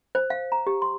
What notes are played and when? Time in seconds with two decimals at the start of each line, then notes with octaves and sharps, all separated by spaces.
0.15 C5
0.30 F5
0.52 A#5
0.67 G4
0.82 C6